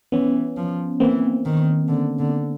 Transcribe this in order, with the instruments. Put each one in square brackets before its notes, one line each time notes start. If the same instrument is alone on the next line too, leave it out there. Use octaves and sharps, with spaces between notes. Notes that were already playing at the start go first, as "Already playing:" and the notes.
[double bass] E3 [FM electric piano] B3 C#4
[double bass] F3
[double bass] E3 [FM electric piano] A#3 C4
[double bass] D#3
D3
D3